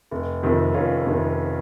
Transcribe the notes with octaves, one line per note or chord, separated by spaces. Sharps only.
F1
F2 C3 D#3
F1 C#4 F4
F2 C3 D#3